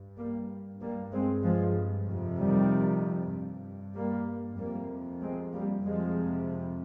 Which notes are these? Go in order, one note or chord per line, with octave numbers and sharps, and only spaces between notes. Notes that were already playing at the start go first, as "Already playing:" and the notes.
Already playing: G2
G3 A#3
G2 G3 A#3
G#3 C4
F3 G#3
F2 C3
D#3 G3
G2
G3 A#3
F2 C3 G3 A#3
G#3 C4
G3 A#3
F2 C3 F3 G#3